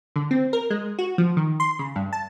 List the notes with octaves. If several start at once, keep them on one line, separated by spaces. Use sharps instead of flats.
D3
C4
A#4
G#3
F#4
F3
D#3
C6
C#3
G2
A5